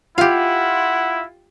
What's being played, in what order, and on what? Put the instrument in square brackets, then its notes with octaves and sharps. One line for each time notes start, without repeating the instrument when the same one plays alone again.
[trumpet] E4 [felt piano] F4 [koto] G4 F5 [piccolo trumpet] F#5